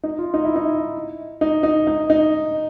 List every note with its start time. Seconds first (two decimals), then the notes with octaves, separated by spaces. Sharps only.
0.03 D#4
0.18 F4
0.34 D#4
0.45 E4
0.56 D#4
1.41 D#4
1.63 D#4
1.87 D#4
2.10 D#4